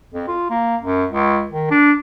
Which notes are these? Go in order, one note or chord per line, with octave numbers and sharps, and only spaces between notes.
F2
F4
A#3
F#2
C#2
D#3
D4